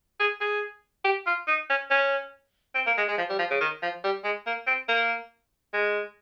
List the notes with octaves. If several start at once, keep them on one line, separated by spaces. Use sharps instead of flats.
G#4
G#4
G4
F4
D#4
C#4
C#4
C4
A#3
G#3
G#3
F3
G3
F3
C#3
D#3
F3
G3
G#3
A#3
C4
A#3
G#3